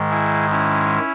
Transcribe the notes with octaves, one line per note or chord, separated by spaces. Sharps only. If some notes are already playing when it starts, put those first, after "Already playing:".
Already playing: G#2 D#3 G#3
E4 G#4
C#4 E4